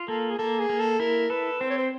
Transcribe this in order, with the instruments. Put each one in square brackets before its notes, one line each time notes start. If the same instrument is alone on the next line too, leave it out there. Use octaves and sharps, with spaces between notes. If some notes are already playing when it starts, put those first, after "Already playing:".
Already playing: [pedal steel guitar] F4
[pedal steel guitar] A#3 [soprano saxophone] A4
[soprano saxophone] G#4
[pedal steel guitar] A#3 [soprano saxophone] A4
[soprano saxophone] G#4
[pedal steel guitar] A#3
[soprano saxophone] A4
[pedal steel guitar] E4 [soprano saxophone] A#4
[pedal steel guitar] A4 [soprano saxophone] B4
[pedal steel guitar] C4 [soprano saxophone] C5
[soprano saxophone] C#5
C5